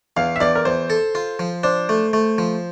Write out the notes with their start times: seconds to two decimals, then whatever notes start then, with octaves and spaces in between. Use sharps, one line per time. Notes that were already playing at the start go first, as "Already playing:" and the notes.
0.17 E2 F5
0.36 E5
0.41 E2 D5
0.55 A#4
0.65 E2 C5
0.90 A4
1.15 F4
1.39 F3
1.63 D4 C5
1.89 A3
2.13 A3
2.38 F3